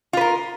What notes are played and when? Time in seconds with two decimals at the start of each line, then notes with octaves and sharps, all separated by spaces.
0.13 F4
0.17 B4
0.21 A#4